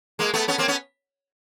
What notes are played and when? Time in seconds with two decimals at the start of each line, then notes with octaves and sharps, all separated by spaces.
0.19 G#3 A#3
0.34 A3 B3
0.48 B3 C#4
0.58 A#3 C4
0.68 B3 C#4